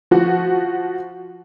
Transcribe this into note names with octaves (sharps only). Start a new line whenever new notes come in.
F3 F#4